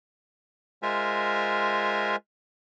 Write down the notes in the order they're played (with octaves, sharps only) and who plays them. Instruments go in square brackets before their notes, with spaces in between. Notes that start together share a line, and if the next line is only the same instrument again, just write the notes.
[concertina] G#3 F4 A#4 C5 E5 G#5